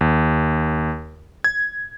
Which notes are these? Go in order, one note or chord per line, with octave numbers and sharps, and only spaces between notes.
D#2
G#6